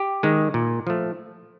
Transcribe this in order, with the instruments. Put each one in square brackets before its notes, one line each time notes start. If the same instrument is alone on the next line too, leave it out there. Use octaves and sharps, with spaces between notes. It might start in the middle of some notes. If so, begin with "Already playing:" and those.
Already playing: [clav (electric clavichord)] G4
D#3 G#3
A#2
F3 A3